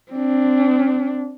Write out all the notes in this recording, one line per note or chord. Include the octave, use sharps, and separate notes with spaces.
C4 D4